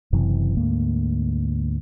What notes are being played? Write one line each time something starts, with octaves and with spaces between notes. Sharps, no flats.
F#1 F#2 C3 E3
D2 G#2 A#3